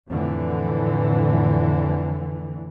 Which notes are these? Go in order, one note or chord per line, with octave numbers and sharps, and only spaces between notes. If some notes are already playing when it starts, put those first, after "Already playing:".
F2 A2 D3 E3